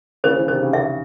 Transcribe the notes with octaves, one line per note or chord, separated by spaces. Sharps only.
C#3 E3 C5
C#3 E3
C3 D#3 C5
C#3
E5